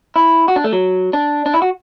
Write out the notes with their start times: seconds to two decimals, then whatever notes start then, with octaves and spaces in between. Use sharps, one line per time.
0.16 E4
0.48 F#4
0.56 D4
0.64 A3
0.73 F#3
1.13 D4
1.46 D4
1.54 E4
1.62 F#4